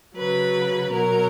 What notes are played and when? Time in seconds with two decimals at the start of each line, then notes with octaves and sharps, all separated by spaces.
0.16 C#3 F#3 B4
0.91 B2 F#3 A#4